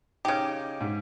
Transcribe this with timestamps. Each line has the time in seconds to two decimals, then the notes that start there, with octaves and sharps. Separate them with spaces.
0.25 C#3 D#4 G4 D6
0.81 G#2